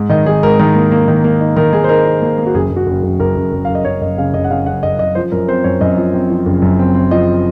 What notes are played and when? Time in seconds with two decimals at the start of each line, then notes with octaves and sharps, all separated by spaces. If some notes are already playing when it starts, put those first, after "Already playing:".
Already playing: G#2
0.10 D#3 D#5
0.26 D#3 G#4
0.43 G#2 A#4
0.59 D#3 A#4
0.75 A#3
0.92 A#3
1.08 D#3
1.24 A#3
1.40 D#4
1.56 D#3 A#4
1.73 D#3 G#4
1.84 C5
1.89 D#4 A#4
2.05 D#4
2.22 A#3
2.38 A#3
2.46 F#4
2.54 F#1 G#4
2.71 F#1
2.76 F#4
2.87 F#1
3.03 F#1
3.20 F#1 A#4
3.36 F#1
3.53 F#1
3.65 F#1 F5
3.75 D#5
3.85 F#1 C#5
4.01 F#1 D#5
4.17 C#3 F5
4.34 F#1 D#5
4.44 F#5
4.50 C#3 F5
4.66 F#1 F#5
4.83 F#1 D#5
4.99 F#1 D#5
5.15 F3 C5
5.32 F#2 A#4
5.48 C4 C5
5.64 F#2 C#5
5.81 F#2 D#5
5.97 F3
6.14 C4
6.30 F3
6.46 F#1
6.62 F#2
6.79 C4
6.95 C4
7.11 F3 D#5